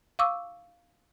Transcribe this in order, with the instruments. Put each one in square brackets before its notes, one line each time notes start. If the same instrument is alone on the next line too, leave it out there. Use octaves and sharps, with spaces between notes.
[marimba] F5 C#6 D6 E6